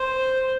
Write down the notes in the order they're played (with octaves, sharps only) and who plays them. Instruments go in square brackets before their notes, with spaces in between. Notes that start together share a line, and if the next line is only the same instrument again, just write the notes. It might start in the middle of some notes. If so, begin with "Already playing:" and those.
Already playing: [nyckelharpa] C5